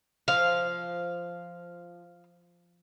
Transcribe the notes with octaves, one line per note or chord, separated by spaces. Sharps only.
F3 F5